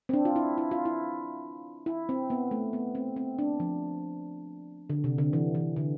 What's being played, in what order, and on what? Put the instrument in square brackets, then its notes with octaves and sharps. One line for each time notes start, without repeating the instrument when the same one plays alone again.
[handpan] C4
D4
F4
E4
E4
F4
E4
E4
C4
B3
A3
B3
C4
C4
D4
F3
D3
C3
D3
E3
E3
D3